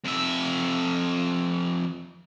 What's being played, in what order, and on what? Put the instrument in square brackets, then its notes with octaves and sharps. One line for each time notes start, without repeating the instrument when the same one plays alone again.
[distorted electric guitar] F2 E5